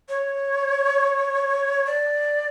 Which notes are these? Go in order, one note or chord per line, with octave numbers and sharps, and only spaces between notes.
C#5
D5